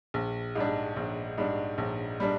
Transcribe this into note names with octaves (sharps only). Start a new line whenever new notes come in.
A#1
G#2 G3 D4
A#1
G#2 G3 D4
A#1
G3 D4